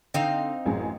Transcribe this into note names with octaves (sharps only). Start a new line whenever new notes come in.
D3 C4 D#4 F5
A1 F#2 G#4